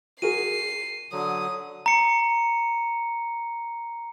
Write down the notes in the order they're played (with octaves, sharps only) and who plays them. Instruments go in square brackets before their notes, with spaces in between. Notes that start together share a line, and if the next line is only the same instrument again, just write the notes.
[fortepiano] F#4 G#4 A#4 [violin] C7 [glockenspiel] D#7
[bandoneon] D3 F#3 [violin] D#6
[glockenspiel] A#5 C#7